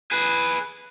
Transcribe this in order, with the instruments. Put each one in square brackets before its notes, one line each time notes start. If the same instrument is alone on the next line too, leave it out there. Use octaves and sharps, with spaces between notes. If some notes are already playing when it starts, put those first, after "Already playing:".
[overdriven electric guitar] G#4 B4